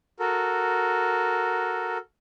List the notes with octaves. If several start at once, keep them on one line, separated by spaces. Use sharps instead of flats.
F#4 A4 A#4